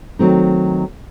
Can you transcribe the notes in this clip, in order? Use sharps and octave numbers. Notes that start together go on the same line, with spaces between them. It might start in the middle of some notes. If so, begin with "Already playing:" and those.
D#3 F#3 A3 C4 D#4